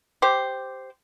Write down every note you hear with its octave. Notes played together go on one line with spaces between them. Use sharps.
G4 C5